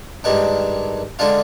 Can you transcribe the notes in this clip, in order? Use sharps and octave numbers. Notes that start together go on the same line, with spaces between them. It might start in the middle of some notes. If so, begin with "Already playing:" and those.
G2 D#3 G#3 D4
D3 G#3 D4 F4